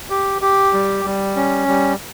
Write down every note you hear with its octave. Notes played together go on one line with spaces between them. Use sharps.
G4
G4
G3
G3
C#4
G3